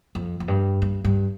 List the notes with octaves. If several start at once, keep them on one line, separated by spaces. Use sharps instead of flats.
F2
F2
G2
G2
G2